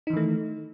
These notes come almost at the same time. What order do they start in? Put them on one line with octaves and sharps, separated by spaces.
D#4 E3 D#3 A3